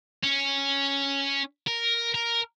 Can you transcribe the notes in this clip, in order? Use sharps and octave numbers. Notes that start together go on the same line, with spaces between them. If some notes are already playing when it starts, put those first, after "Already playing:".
C#4
A#4
A#4